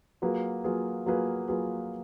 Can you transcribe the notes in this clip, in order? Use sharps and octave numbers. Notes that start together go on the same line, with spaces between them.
F#3 A#3 F4 G#4 B4
F#3 A#3 F4 G#4 B4
F#3 A#3 F4 G#4 B4
F#3 A#3 F4 G#4 B4